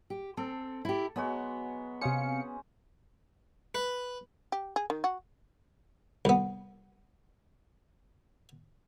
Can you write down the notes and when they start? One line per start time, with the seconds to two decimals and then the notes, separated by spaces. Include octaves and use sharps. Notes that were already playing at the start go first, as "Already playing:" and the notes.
0.10 G4
0.37 C4 A4
0.85 E4 G4
1.16 F#3 G#3 B3 F#4
2.01 C3 C#4 C5 F5 D#6 C#7
3.75 B4
4.52 G4
4.76 G#4
4.90 D#3
5.04 F#4
6.25 C2 B3